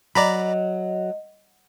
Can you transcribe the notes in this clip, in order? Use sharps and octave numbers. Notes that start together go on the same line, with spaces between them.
F#3 D5 D#5 A#5 B5